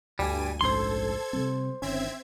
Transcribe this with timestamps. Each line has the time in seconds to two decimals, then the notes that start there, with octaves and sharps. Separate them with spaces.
0.19 D2 G2 G3 G#5 D#7
0.61 A#1 G#2 C#4 A4 C5 C6 G#6
1.33 C3 G3 C4
1.82 G1 D#3 C4 C#4 E5 G#6